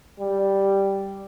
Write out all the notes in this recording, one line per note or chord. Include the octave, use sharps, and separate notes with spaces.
G3